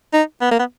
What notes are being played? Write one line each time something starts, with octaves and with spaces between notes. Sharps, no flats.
D#4
B3
A#3
B3